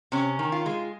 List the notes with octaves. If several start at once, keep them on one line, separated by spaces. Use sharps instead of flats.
C3 C#4
D#3
F4
G#3